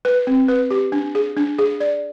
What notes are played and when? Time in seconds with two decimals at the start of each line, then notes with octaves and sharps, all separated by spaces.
0.05 B4
0.27 C4
0.48 B4
0.71 G4
0.92 D4
1.15 G#4
1.37 D4
1.59 G#4
1.80 D5